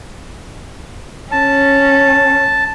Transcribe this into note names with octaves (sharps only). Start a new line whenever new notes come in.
C#4 A5